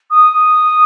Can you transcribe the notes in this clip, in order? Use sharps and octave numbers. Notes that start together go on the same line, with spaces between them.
D#6